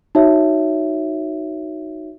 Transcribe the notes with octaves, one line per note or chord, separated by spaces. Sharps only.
D#4 F#4 C#5 E5